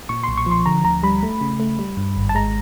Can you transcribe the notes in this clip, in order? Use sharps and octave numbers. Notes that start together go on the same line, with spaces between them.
A#2 C#6
B1 C6
C#6
F3 C6
D3 A#5
D2 A#5
G3 B5
A3
C#3
A3
G3
G2
G#1
A5
G#3 A#5